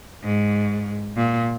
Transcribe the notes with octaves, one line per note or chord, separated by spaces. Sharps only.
G#2
A#2